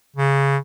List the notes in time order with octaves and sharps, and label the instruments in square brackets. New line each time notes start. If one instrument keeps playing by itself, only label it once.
[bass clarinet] C#3